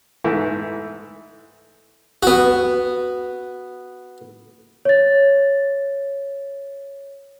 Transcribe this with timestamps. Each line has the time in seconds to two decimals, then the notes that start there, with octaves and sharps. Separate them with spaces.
0.24 G#2 E3 A3 E4
2.23 B3 F#4
4.85 C#5 A6